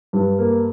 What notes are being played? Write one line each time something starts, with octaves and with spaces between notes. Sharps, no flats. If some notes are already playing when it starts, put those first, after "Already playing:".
G2
A#3